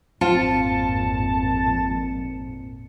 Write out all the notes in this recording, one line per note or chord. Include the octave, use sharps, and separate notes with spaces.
G#1 F2 A#2 C4 F4 A5 C#7